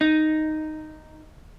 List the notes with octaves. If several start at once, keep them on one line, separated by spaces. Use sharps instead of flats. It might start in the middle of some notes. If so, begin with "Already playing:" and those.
D#4